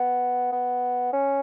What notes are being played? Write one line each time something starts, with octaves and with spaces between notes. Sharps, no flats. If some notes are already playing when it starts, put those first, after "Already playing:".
Already playing: B3
B3
C#4